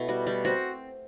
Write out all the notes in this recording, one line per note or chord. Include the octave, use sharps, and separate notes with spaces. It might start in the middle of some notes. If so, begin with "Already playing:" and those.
Already playing: B2 A3 E4
G3 F#4
G3
C4 F#4